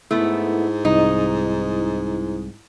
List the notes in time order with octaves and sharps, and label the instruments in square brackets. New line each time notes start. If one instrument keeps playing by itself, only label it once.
[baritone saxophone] G#2 [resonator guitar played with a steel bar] A3 B3 [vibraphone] E4
[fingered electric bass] C2 [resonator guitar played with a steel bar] D#4